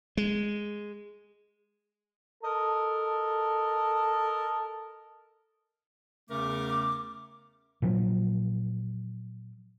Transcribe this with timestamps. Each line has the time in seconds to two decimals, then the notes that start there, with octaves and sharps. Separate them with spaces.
0.17 G#3
2.43 A4 A#4 D#5 A5
6.29 E2 C#3 A3 C#4 A#4 D6
7.82 A#2 F3 F#3